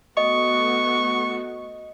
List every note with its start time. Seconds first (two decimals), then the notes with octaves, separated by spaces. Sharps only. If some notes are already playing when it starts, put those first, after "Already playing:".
0.17 A3 B3 F#4 D#5 C#6